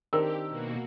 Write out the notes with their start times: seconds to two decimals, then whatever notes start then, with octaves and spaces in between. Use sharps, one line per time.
0.13 D#3 C4 D4 G4 A#4 E6
0.48 B2 A#3 F#4